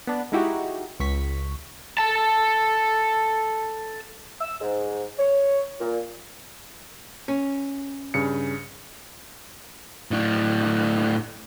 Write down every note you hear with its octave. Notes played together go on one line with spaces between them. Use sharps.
B3 D4
G#3 D#4 E4 F#4 G4
C#2 C#6 B6
A4 A5
E6
G#2
C#5
A#2
C#4
G2 C#3 C#7
A2 D4